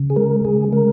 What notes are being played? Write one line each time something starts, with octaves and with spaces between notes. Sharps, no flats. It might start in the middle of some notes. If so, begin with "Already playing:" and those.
Already playing: C#3
G#4
G#3 A#4
C#3 G#4
G#3 A#4